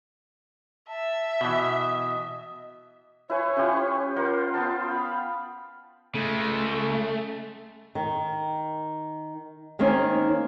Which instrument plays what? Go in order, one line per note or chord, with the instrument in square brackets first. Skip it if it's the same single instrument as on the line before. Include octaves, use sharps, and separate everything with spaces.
[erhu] E5 [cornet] A5
[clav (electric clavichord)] B2 E3 [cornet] D#5
[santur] E4 B4 G#5 [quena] C#5
[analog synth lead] C#4 [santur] F4 G4 B4
[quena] F4 [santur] A#4 C5 F#5
[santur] B3 G5 A5
[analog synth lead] F5 [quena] B5
[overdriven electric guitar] C#3 G#3 [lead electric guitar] A3
[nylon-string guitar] D#3
D#3 A#3 C4 C#4 D#4